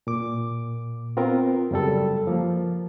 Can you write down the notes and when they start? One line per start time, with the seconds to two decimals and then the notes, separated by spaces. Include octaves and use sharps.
0.07 A#2 D6
1.17 B3 C4 F4 A#4
1.71 F#2 C#3 G3 A4
2.27 F3 A#3